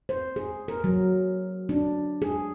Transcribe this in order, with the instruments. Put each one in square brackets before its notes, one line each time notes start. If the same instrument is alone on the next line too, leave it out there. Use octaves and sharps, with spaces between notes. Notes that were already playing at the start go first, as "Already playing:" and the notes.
[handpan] C5
G#4
A#4
F#3
D4
G#4